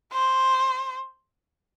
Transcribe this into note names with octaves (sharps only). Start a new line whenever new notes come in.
C5